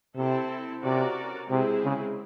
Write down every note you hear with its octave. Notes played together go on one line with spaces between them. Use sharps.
C3 C4 E4 A4
C3 C#4 F#4 A#4 D5
C3 G#3 C4 E4 G#4
C#3